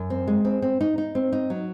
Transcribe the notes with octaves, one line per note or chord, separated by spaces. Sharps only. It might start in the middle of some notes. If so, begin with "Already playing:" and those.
Already playing: F#2
C4
G#3
C4
C4
D#4
D#4
C4
D#4
F#3